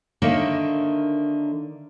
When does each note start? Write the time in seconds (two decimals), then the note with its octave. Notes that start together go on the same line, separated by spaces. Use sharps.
0.22 D3 D#3 A#3 C#5 E5